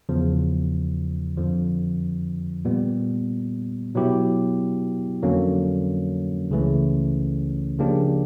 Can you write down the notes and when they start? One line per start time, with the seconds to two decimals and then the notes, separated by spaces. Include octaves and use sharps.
0.09 E2 C#3 F3
1.37 F2 D3 F3
2.65 A#2 G3 B3
3.95 B2 F#3 B3 E4 G4
5.23 F2 D3 F#3 A#3 C#4
6.50 C#2 C#3 E3 A3 C#4
7.79 C#3 F3 A#3 D4 G4